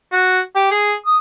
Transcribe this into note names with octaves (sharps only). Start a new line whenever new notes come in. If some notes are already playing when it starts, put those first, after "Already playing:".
F#4
G4
G#4
D#6